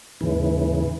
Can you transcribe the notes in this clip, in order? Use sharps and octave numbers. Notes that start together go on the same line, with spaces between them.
D#2 G#2 C#3 E3